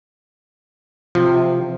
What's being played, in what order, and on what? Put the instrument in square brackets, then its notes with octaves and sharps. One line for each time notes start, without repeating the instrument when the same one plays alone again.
[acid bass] C3 [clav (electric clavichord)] F3